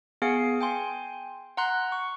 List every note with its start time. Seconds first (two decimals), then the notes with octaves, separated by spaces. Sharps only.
0.22 B3 G#4 F5 G#5 C7 C#7
0.61 G5 G#5 C6
1.57 F#5 A#5 C6 F#6
1.92 C#6